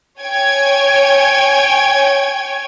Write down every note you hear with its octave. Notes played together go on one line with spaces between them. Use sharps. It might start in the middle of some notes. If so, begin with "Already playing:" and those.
C#5 G5 G#5 G#6